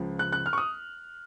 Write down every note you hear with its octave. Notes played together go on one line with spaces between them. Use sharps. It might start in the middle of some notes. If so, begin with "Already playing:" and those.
Already playing: C#2 C#3 F3
F#6
F#6
F6
C#6
D#6